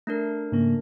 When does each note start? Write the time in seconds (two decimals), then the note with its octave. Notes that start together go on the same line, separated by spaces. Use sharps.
0.07 A3 D4 A#4
0.52 G#2 C#3 A#3